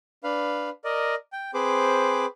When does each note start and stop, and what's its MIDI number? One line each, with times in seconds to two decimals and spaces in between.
0.24 0.70 62
0.24 0.70 71
0.24 0.70 77
0.84 1.15 70
0.84 1.15 74
0.84 1.15 75
1.33 1.51 79
1.54 2.26 60
1.54 2.26 68
1.54 2.26 71
1.54 2.26 72
1.54 2.26 86